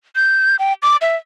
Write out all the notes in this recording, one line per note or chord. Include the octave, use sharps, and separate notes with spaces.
G6
G5
D6
E5